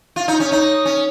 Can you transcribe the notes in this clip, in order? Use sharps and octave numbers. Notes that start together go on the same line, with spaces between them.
F4
D#4
C#4
D#4
C#4